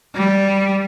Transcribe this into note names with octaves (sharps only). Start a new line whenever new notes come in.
G3